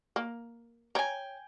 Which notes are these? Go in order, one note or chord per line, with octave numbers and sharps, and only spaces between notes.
A#3
C#5 G5 G#5 A#5